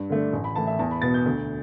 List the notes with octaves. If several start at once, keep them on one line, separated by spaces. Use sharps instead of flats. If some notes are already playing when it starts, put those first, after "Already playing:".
Already playing: G2
D3 A3 D4
A1
B5
A2 E3 A5
E5
E2 A5
B5
B2 B3 A6
G6
D2